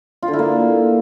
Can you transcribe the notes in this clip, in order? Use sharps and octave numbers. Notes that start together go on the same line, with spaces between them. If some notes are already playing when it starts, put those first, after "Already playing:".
F4
D3
E4
A#3